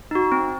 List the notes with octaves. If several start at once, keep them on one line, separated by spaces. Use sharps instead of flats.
D#4 F#4
C4